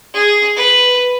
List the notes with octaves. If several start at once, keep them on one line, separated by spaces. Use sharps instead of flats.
G#4
B4